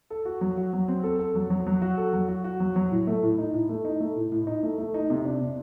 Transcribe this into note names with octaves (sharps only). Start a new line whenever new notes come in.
A4
F#4
F#3
F#4
F#3
C4
A4
A4
F#3
F#3
F#3
F#4
A4
F#3
F#4
F#4
F#3
F#3
A2
A3
A2
D#4
A2
A3
D#4
A3
A2
A2
D#4
A3
A3
D#4
C3
D4
C3